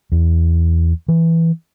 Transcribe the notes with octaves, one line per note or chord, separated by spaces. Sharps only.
E2
E3